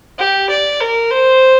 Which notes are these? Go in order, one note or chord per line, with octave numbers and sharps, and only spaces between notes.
G4
D5
A#4
C5